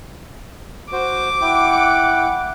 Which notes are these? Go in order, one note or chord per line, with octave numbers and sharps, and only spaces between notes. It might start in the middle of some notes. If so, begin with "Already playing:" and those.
F#4 C5 D6
E4 F#5 G5